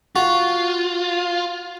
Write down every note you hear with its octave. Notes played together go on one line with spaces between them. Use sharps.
F4 F#4